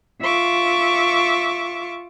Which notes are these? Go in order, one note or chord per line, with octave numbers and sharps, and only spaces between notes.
F4 E5 C#6 D6